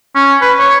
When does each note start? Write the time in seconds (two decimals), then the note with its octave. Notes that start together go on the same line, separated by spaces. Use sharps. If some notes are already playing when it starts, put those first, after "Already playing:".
0.15 C#4
0.41 B4
0.59 C#5